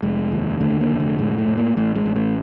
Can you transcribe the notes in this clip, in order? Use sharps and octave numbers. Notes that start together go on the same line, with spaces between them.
F1 G#3
D#2
D3 A3
A#3
F1
A3
A2 G#3
A3
A2
A#3
A1 A3
G#3
A1
A3